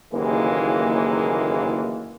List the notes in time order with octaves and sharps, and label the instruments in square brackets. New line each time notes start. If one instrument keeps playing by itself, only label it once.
[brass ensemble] F#1 D#2 A2 E3 G#3 A#3